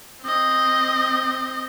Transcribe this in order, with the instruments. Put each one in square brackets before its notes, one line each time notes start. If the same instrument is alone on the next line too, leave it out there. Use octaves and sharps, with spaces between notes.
[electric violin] C4 D#5